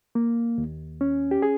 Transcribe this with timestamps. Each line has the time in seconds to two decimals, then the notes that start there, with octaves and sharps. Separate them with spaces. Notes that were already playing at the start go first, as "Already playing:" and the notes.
0.15 A#3
0.58 D#2
1.01 C#4
1.31 G4
1.42 G#4